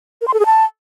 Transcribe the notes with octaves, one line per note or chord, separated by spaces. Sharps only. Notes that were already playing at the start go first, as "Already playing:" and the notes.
A#4
C6
A4
G#4
A5